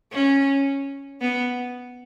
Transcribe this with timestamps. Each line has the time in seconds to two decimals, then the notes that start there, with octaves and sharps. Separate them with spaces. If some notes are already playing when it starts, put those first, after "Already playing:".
0.12 C#4
1.21 B3